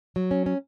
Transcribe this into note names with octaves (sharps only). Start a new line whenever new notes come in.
F#3
C#4
C#4